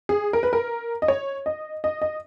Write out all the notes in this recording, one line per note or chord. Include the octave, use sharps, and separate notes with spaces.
G#4
A#4
B4
A#4
D#5
C#5
D#5
D#5
D#5